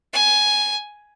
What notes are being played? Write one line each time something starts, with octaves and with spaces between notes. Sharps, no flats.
G#5